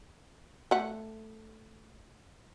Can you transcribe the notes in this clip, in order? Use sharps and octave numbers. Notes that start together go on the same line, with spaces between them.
A3 F#5